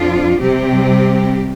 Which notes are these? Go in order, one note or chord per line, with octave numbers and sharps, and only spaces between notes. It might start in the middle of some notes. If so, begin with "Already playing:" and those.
Already playing: F2 F3 D4 F4
C3 G3 C4 G4